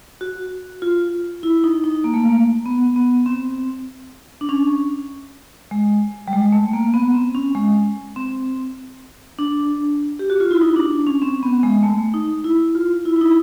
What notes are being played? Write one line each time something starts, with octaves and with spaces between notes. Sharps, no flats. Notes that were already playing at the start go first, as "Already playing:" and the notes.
F#4
F4
E4
D#4
D#4
A#3
A3
A#3
B3
B3
C4
D4
C#4
G#3
G3
G#3
A3
A#3
B3
C4
C#4
G#3
C4
D4
G4
F#4
F4
E4
D#4
D4
C#4
C4
B3
G#3
A3
D#4
E4
F4
E4
E4
D#4